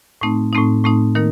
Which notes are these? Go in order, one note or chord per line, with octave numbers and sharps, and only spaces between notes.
A2 A3 C4 D#4
A2 A3 C4 D#4
A2 A3 C4 D#4
D#3 A#3 D#4 A#4